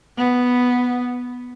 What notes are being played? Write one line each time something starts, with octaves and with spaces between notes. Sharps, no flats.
B3